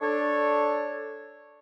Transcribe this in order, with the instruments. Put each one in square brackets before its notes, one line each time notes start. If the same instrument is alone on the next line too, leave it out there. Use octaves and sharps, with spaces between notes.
[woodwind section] D4 A4 C#5